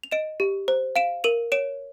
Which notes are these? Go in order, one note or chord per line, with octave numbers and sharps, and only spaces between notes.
F7
D#5 D7 E7
G4
C5
F5 D7 E7
A#4 D#7 F7
C#5 D7 E7